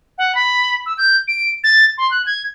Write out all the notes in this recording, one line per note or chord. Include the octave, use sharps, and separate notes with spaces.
F#5
B5
E6
G6
D7
A6
C6
F#6
G#6